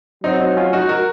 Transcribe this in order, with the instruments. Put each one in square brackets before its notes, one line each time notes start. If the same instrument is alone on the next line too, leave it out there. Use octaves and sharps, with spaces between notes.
[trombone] F#3 [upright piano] C4 D#4
[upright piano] C4 D#4
C#4 F4
D#4 F#4
F#4 A#4